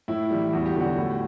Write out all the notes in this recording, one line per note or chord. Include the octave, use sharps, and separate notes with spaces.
A2 E4
E3 G3
E2 F#4
G4
D3 F#3 F#4
A2